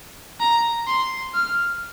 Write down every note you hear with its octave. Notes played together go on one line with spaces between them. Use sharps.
A#5
C6
F6